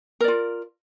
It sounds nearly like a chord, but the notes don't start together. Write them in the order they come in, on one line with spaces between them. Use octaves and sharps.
A#4 D5 F4